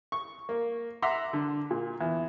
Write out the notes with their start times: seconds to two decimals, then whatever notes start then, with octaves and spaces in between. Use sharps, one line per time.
0.12 C#6
0.49 A#3
1.02 E5 F#5 A#5 C6 D6
1.33 D3
1.71 A#2
2.01 E2